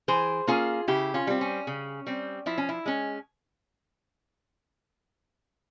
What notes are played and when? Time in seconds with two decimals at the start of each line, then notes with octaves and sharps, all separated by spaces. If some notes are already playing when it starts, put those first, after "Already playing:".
0.08 E3 G#4 C5
0.47 A#3 C#4 F4 G#4
0.88 C#3 E4 G4
1.14 C#4 F4
1.27 G3 C4
1.41 C#4
1.67 C#3
2.07 G3 C4
2.46 F3 E4
2.58 C#4
2.69 E4
2.86 G#3 C#4